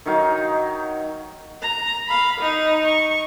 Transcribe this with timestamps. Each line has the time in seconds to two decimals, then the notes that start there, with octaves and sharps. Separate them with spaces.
0.06 D#3 F#3 D#4 F5
1.62 A#5
2.06 F5 B5
2.40 D#4
2.85 C#6